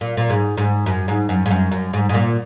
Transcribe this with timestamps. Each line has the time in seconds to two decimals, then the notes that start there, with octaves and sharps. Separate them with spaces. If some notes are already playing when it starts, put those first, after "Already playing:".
0.01 A#2
0.17 A#2
0.30 G#2
0.57 G#2
0.86 F#2
1.08 G#2
1.29 F#2
1.46 G#2
1.51 F#2
1.71 F#2
1.93 G#2
2.09 G#2
2.14 A#2